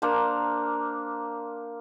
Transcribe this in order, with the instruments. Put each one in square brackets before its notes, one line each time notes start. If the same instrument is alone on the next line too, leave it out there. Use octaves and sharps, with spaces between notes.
[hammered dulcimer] A#3 D4 A#4 C5